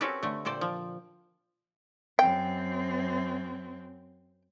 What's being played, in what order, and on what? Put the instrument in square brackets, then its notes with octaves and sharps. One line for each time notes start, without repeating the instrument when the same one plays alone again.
[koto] C4 C#4 F#4 G4 A4 B4
D3 A3
A#2 A4 C5 D5 G5
F3
[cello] F#2 C4 [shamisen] G5